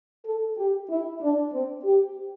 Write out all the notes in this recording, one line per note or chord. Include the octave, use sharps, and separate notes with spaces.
A4
G4
E4
D4
C4
G4